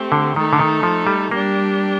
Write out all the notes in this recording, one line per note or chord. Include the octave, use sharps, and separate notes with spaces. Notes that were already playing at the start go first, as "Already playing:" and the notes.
Already playing: A3 C4 G4
D3
D#3 A3 D#4 A4
D3
D#3
F3
G3
G3 A#3 D4 G4